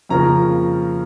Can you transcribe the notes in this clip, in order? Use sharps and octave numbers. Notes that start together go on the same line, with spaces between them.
F2 C#3 F3 A#3 A#5